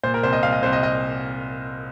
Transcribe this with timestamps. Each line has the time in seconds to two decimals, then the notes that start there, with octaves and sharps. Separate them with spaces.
0.03 A#2 C5
0.14 A#4
0.23 C2 C5
0.33 D#5
0.43 C2 F5
0.52 D#5
0.63 C2 C5
0.73 D#5
0.83 D#5